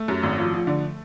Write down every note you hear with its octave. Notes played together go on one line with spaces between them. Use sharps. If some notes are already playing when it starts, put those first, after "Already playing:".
Already playing: A3
F#2
G#1
F3
F3
D3